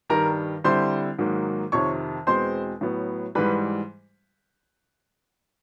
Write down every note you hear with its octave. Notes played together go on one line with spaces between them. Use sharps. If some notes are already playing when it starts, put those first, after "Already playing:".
G2 D#3 G3 A#4 A#5
D3 G3 C4 E4 C5 C6
G#2 D#3 F#3 A#3
F2 C3 D#3 C#5 C#6
E2 B2 G#3 C4 C5 C6
A2 F#3 B3
G#2 E3 G3 B4 B5